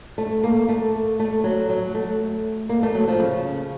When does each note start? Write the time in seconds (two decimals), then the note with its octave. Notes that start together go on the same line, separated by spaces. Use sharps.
0.18 A3
0.44 A#3
0.69 A3
1.20 A3
1.44 F#3
1.69 F#3
1.95 A3
2.69 A#3
2.83 A3
2.95 F#3
3.08 F3
3.20 C#3